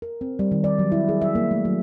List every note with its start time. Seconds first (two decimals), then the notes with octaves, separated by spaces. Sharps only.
0.02 A#4
0.21 C4
0.39 G3
0.52 D#3
0.64 D5
0.79 F#3
0.92 E4
1.09 G#4
1.22 E5
1.35 A#3
1.51 A3
1.65 F#3